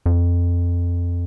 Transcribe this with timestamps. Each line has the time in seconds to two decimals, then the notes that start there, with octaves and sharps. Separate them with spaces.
0.06 F2